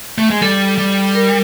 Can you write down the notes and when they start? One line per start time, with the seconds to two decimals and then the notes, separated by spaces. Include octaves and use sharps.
0.18 A3
0.30 G#3
0.42 G3 A4
0.78 G3
1.15 A#4